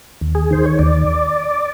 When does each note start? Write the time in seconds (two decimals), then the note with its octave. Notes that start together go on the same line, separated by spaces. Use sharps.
0.21 D#2
0.35 G#4
0.51 D#3 C5
0.66 C#5
0.79 D#2 D5